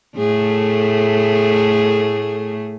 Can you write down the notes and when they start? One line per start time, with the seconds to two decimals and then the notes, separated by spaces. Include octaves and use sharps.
0.17 A2 A3 G#4